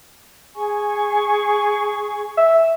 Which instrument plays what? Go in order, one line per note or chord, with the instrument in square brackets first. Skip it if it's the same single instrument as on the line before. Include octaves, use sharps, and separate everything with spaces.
[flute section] G#4 G#5 C#6
[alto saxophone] E5